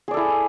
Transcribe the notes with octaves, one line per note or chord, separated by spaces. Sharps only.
E4 G#4 A4 D5